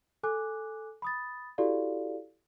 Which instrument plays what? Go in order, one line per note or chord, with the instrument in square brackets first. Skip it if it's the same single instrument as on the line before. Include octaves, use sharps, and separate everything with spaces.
[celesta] A4 G#5 D6 F#6
B5 D#6 A6
E4 F#4 G4 A4 D5 F5